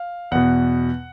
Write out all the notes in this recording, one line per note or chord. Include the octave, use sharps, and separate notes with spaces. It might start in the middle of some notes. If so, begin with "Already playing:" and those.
Already playing: F5
E2 B2 F#5